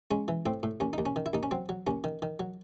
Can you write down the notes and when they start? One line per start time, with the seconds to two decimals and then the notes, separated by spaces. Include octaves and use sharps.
0.11 G#3 C#4
0.28 E3
0.46 A2 C4
0.63 A2
0.80 D#2 C#4
0.93 D#2 D#4
1.06 C#4
1.16 D#3
1.26 E4
1.33 D#2 D#4
1.43 C#4
1.51 F#3 C4
1.69 F#3
1.87 D#2 C#4
2.04 D#3
2.22 D#3
2.40 F#3